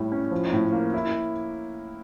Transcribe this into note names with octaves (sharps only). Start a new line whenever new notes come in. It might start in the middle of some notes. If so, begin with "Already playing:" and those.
Already playing: A2 G3
C#4
F3
A2
A#3
E4